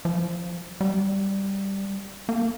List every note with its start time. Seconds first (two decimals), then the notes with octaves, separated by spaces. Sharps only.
0.05 F3
0.81 G3
2.29 A#3